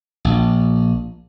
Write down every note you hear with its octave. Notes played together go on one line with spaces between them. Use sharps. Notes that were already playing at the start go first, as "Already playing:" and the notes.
A#1